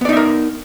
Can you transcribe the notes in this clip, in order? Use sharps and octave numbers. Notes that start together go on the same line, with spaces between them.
B3 D#4 A#4 D5 E5